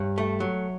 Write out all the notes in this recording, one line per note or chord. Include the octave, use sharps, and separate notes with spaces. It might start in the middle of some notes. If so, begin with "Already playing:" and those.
Already playing: G2 C#5
A3
F#3